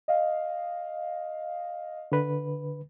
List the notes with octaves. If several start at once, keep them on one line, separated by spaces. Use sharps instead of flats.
D#5 F5
D3 B4